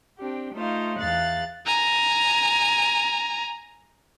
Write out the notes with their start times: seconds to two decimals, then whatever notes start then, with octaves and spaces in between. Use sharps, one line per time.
0.18 C4 D4 G4
0.53 A3 D#4 F4 C5 F5
0.99 E2 F5 F#6 A6
1.66 G#5 A#5